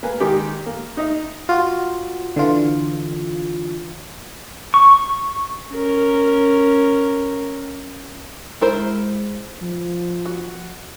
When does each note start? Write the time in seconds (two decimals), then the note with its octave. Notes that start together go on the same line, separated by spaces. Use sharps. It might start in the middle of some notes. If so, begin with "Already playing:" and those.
0.03 A#3 B4 G#5
0.20 D#3 G#3 D#4 G4
0.66 A#3
0.97 D#4 D#5 E5
1.49 F4 F#4
2.36 D3 E3 F4
4.74 C#6
5.74 C#4 A#4
8.62 G#3 E4 A#4 C5
9.61 F3
10.26 F#4